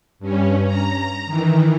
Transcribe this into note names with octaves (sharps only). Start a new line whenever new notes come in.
G2 C#4
A#5
D#3 E3